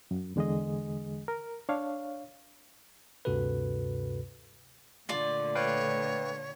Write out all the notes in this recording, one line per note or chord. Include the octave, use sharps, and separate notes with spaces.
F#2
E2 D3 G#3 G#4 D#5
A#4
D4 C#5 F5
D2 G2 C3 F#4 A4 B4
A#2 D3 A3 F4 D5
B4 C#5 F5 G5